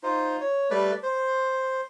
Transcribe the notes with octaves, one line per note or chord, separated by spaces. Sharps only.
D#4 F4 C5
C#5
G3 A3 B4 D5
C5